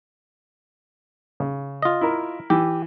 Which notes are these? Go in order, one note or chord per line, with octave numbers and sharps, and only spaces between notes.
C#3
F4 D#5
E4 A#4
E3 G4